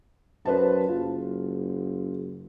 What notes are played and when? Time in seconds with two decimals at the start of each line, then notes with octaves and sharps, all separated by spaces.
0.46 F#2 B4 C5 A5
0.89 F#1 F4